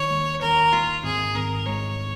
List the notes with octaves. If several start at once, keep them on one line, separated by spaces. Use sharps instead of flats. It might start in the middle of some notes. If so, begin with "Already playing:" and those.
Already playing: D#3 C#5
D#2
D#3 A#4
A#3 F4
G#1 G#4
G#1 A#4
G#3 C#5